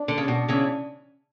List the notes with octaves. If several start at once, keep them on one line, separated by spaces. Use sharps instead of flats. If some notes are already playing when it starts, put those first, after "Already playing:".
Already playing: D4
D3
C#3
B2
C#3 E3